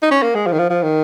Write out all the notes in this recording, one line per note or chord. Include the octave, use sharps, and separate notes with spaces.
D#4
C#4
A#3
G#3
F3
D#3
F3
F3
D#3